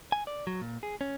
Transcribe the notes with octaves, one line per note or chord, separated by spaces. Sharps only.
G#5
D5
F#3
A#2
G#4
C#4